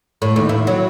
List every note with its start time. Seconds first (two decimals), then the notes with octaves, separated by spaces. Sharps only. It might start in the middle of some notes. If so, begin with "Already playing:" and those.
0.22 A2
0.36 D#2
0.49 E4
0.67 F#3